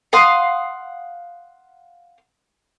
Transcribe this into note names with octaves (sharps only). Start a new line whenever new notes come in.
F5 F#5 C6 D#6